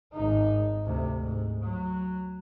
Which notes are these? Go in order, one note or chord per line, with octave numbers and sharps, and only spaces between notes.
G#1 D#4
D2 C3
G#2
F#3